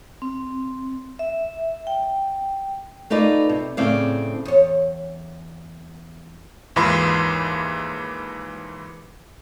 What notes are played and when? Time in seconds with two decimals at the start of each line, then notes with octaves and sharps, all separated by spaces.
0.22 C4
1.19 E5
1.87 G5
3.10 A3 D#4 F4 B4 D5
3.49 C3
3.77 A2 C#3 C4 E4 D5 F5
4.45 E2 C#5
6.76 D#2 G#2 E3 F4 B5 C6